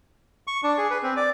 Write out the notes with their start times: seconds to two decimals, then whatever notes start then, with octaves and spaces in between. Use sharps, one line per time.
0.47 C#6
0.63 D4
0.78 G#4
0.90 B4
1.03 C4
1.16 D5